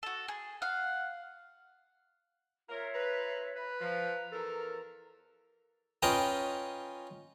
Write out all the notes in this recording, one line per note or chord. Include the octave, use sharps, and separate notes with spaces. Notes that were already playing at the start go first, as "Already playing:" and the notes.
F#4 A4
G#4
F5 F#5
F4 A#4 C#5 E5
B4 A#5
B4 B5
F3 A#5
E2 A4 A#4
C#4 F4 B4 D#5 G5 A#5